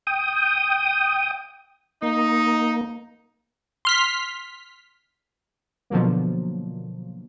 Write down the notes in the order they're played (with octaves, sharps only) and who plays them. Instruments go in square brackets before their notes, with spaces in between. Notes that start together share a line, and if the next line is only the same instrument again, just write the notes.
[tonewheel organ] G5 D#6
[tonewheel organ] A#3 [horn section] D#4
[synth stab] C6 F6 B6
B2 D3 F3 F#3 A#3